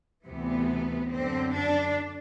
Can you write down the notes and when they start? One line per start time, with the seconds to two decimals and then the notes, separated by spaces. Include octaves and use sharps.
0.25 D2 C3 E3 B3
1.10 F#2 D3 C4
1.52 D4